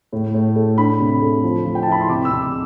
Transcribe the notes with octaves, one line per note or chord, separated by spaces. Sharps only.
A2
A2
A3
D4 B5
C3
A3
F3
F3
G5
A5
E4 B5
C6
C3 D6
E6
C3
D6